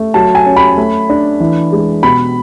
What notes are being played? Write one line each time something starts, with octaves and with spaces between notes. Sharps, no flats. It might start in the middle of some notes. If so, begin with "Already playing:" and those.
Already playing: A3
F#3 A5
G#5
C#4
B5
A3
D4
E3
G#3
B2 B5